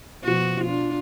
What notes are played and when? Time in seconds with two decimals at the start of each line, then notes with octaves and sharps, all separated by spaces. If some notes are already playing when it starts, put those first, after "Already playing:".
0.24 B2 F3 F#4
0.64 D4 F4